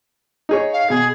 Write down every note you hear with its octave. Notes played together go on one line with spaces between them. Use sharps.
D#4 G#4 C#5
F5
B2 G#4